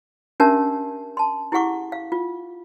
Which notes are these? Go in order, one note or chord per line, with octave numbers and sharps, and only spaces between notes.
C#4 D4 G4 A#4 E5 A5
A5 C6
E4 G4 G#4 F#5 C#6 D6
F5
F4